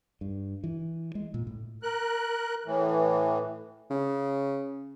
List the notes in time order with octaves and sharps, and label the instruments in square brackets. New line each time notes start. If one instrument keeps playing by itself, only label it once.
[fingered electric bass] G2
E3
G#3
A#2
A2
[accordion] A#4 F#6
A2 E3
[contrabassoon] C#3